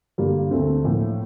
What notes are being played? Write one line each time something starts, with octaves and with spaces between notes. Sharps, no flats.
G2 D3 G3 A#3 F4
D2 D3 A3 C4
A2 F3 A#3